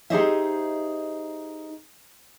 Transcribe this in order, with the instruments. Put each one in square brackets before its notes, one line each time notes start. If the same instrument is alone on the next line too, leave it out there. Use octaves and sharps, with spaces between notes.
[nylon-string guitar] D#4 G4 G#4 C5 D#5 E5